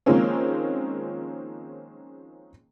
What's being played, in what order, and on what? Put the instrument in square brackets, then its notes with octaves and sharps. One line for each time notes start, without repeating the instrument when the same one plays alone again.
[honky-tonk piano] D#3 F3 G#3 A#3 C4 C#4